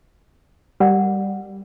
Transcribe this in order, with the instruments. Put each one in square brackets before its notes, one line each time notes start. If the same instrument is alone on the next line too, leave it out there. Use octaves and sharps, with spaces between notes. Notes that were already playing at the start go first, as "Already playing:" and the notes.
[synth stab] G3 [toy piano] A#4 D5 F#5